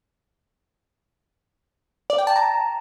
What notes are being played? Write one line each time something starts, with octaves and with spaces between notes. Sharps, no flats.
D5
G5
A5
A#5